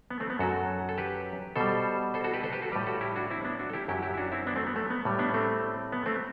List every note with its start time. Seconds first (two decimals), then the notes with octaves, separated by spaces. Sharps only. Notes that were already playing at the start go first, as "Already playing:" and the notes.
0.10 B3
0.20 A3 C4
0.30 B3
0.39 F#2 F#3 F#4 A4
0.89 A4
0.98 G4 B4
1.56 B2 G3 A4 C5
2.14 A4 C5
2.24 F#4 A4
2.33 G4 B4
2.43 A4 C5
2.52 G4 B4
2.62 F#4 A4
2.72 A2 G3 G4 B4
2.86 F#4 A4
3.01 E4 G4
3.16 D4 F#4
3.30 C4 E4
3.44 B3 D4
3.59 D4 F#4
3.70 A4
3.73 E4 G4
3.88 F#2 F#3 E4 G4
4.02 E4 G4
4.14 E4
4.17 D4 F#4
4.32 C4 E4
4.47 B3 D4
4.56 A3 C4
4.67 B3
4.76 A3
4.90 B3
5.05 A2 G3
5.19 B3 D4
5.34 A3 C4
5.92 B3
6.06 A3 C4